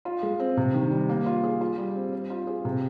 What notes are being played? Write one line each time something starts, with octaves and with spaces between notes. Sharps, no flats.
F4
G#3
C4
C3
D#3
G3
A#3
F4
G#4
F4
G3
C4
C5
F4
G#4
C3